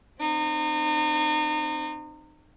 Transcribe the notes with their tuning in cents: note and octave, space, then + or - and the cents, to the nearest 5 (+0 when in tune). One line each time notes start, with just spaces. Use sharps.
C4 +0 D#4 -35